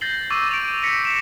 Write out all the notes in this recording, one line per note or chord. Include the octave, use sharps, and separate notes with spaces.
G6 A6 A#6 C7 F#7 G7
C#6 D6 E6 G6 A6 D#7
D7 F7
A#6 B6 C#7
B6 E7